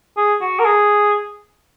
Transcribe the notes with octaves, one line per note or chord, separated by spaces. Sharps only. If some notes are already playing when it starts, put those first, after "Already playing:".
G#4
F#4
A#4
G#4